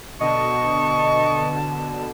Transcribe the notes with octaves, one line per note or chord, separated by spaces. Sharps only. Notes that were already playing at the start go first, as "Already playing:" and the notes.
B2 D3 D#5 A5 C#6